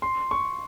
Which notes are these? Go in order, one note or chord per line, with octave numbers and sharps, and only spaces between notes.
C6
C#6